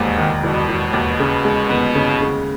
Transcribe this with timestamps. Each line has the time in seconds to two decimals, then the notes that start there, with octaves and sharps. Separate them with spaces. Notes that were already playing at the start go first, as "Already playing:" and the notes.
Already playing: E1 D#2 G#2
0.18 D#3
0.43 E1 B2
0.69 E1
0.93 D#2
1.20 C#3
1.45 G#3
1.69 B3
1.95 C#3
2.21 C#3